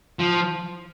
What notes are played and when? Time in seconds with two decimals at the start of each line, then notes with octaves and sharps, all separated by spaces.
0.19 F3